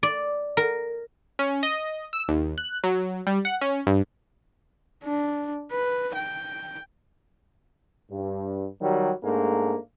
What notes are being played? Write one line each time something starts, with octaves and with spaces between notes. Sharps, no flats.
D5
A#4
C#4
D#5
E6
D#2
F#6
F#3
G3
F#5
C#4
G2
D4
B4
G5
G2
D#3 F#3 G3
G#2 A3 A#3 D4